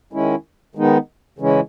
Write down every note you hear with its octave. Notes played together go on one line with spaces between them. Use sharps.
D#3 G#3 C#4 E4
D#3 G#3 B3 D#4
C#3 E3 G#3 C#4 E4